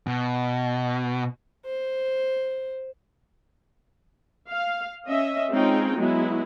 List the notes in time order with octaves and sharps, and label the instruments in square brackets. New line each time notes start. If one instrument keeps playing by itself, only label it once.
[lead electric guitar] B2
[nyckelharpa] C5
[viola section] F5
C#4 D#5 E5
G#3 C4 C#4 D#4 F4 G5
F#3 G#3 B3 E4